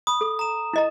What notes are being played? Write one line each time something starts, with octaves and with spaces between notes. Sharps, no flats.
B5 D#6
A4
A#5 E7
E4 D#5 A#5